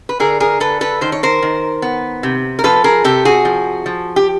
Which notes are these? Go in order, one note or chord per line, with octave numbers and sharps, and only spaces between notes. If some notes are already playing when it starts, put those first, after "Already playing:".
B4
D3 G#4 A#4
G#4 A#4
D3 A4 B4
A4 B4
D#3 C5
C#5
A#4 C5
D#3
B3
C3
A#4
F3 A4 B4
G#4 A#4
C3 G4 A4
F#4 G#4
F3
F3
G4